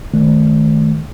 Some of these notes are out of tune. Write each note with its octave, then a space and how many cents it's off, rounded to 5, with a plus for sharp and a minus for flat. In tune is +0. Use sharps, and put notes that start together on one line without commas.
D#3 +0 A3 -25